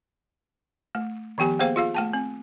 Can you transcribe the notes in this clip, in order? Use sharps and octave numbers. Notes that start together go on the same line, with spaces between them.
A3
D#3 F3 B3 G4 G#5
A#3 B3 G#4 C5 F5 G5
F4 G#4 F5
A3 G5 A5
C4